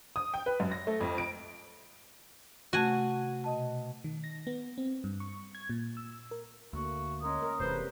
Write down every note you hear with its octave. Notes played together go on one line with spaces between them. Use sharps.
D#6
G5
B4
F#2
A#6
A3
F2
D7
C3 A3 F#4 G#5 A5
B2 D#5 A5
D#3
A#6
B3
C4
G2
C#6
G#6
A#2
E6
A#4
D2 A3 A#3 F#4
G#3 C#4 A#4 A#5 D#6
A#4
E1 E2 C3 G#3 B4 C5